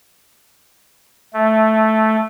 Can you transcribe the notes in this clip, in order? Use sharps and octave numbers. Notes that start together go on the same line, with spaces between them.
A3